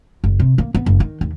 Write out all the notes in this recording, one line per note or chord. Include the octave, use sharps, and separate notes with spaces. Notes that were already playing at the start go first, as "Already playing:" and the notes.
F#1
C3
A#3
B3
F#1
D#3
D#2